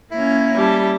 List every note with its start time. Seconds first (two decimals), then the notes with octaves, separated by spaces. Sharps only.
0.12 A#3 C#4 E4
0.56 G3 A5